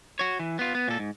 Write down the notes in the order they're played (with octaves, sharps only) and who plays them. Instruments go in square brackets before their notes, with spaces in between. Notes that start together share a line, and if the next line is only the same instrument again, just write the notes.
[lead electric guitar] F#4 C#5
E3
B3 F4
B3
A#2 A4
G#2